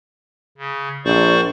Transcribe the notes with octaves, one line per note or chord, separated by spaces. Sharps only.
C#3
A#1 C5 D5 C#6